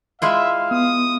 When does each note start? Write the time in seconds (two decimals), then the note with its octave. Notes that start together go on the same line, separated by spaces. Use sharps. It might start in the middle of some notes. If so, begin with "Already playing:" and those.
0.22 G#3 E4 F4 E5 F5
0.71 B3 D#6